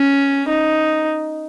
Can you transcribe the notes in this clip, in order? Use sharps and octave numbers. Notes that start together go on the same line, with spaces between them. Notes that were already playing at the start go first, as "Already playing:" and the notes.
Already playing: C#4
D#4